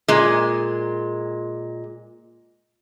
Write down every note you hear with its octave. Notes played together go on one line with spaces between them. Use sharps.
A#2 G#3